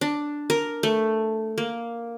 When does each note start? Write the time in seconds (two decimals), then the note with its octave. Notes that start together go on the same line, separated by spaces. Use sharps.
0.01 D4
0.50 A#4
0.83 A3
1.58 A#3